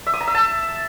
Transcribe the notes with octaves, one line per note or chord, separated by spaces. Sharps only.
E5
D#6
A#5
E5
A5